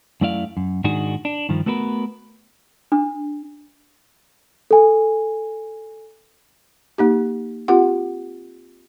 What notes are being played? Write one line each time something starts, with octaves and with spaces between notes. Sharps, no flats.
F#2 A3 E4 D5 F5
F#2
G#2 D#3 D4 D#4 F#4 G#4
D4
G2 D#3 F3
A3 B3 F#4 A#4 B4
D4
A4 G#5
A#3 D#4 G4
C4 F4 G4 F#5